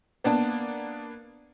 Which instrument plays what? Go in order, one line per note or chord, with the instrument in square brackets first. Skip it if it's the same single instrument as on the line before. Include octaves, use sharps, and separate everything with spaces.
[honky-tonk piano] A#3 B3 D4 A5